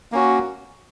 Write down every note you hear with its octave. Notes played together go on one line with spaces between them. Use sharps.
A#3 C#4 F#4